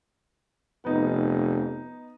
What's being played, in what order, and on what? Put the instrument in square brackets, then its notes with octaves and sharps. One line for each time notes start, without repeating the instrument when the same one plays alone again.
[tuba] F1 [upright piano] B3 D#4